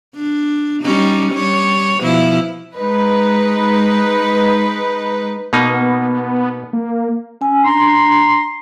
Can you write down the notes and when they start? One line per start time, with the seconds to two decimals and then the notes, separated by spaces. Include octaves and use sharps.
0.15 D4
0.83 G3 C#4 D#4
1.32 G3 C#5
1.99 B2 F3 E4
2.75 G#3 D#4 B4
5.53 B2 A#3 B3 D#4
6.73 A#3
7.41 C#4 G#5 E6
7.65 D4 A#5 C6